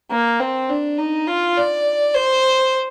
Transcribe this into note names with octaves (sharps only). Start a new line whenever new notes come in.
A#3
C4
D4
D#4
F4
D5
C5